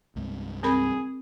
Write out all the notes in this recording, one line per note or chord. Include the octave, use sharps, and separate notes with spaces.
C2 G2 G#3
C4 G#4 A#4 B5